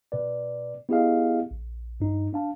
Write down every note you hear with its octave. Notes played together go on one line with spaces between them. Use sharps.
B2 B4 D5
B3 E4 G4 G#4 D#5 F5
A#1
G2 D#4
D4 F5 A5